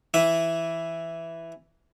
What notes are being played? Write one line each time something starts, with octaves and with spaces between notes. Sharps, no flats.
E3 E5